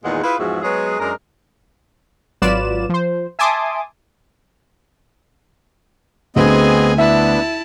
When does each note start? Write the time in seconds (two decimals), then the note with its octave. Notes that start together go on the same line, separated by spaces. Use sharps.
0.04 E2 A#2 D#3 G#3 D#4 F#5
0.23 E4 F4 G#4 B4
0.39 E2 G#2 F3 F#4 G#4 E5
0.63 F#3 G#3 B3 G#4 B4 C#5
1.00 F#2 G#3 D4 A#4
2.42 G#1 F#3 F4 B4 D5 E7
2.89 F3 C5
3.39 E5 G#5 A5 C6 D6 D#6
6.36 D2 B3 C4 G#4 D#5 G#5
6.98 B3 D4 E4 E5 A5